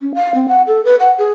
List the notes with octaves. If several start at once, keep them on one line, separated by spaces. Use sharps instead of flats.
C#4
F5
C4
F#5
A4
B4
F#5
G#4